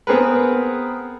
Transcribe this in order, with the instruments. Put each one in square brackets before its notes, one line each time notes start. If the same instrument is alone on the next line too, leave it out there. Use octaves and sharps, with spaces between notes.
[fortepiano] B3 C4 G#4 A#4 B4